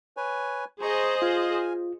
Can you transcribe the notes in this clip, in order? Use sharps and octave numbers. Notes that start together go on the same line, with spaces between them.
B4 C#5 G#5
G#4 C5 D#5 A#5 C6 C#6
F4 F5 G#5